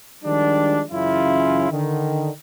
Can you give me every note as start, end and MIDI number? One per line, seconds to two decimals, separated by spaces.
0.24 0.82 51
0.24 0.82 53
0.24 0.82 55
0.24 0.82 56
0.24 0.82 62
0.90 1.70 42
0.90 1.70 49
0.90 1.70 52
0.90 1.70 61
0.90 1.70 64
0.90 1.70 65
1.71 2.30 50
1.71 2.30 51